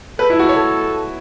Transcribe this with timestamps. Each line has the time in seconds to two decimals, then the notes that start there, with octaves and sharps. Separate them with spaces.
0.19 A4 B4
0.30 E4
0.39 F#4
0.49 C#5
0.58 A4